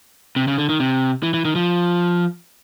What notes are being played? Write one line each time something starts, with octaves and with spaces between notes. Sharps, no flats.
C3
C#3
D3
D#3
C3
E3
E3
D#3
F3